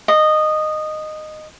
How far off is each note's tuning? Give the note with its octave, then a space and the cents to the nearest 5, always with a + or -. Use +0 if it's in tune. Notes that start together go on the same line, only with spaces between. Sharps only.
D#5 -15